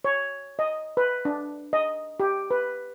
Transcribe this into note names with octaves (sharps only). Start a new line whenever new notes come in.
C#5
D#5
B4
D4
D#5
G4
B4